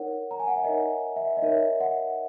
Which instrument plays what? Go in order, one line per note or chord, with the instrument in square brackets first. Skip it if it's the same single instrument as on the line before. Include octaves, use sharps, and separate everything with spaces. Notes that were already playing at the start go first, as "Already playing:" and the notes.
Already playing: [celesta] D#4 A#4 C#5 F#5
A#5
G#5
F#5
E5
D#4 A#4 C#5 D#5
E5
D#5
D#4 A#4 C#5 E5
F#5